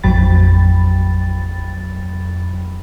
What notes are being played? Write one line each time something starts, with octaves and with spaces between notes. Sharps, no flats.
A1 F2 F#3 G5 B5 A6